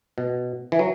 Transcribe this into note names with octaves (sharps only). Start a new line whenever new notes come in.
B2
E3
F#3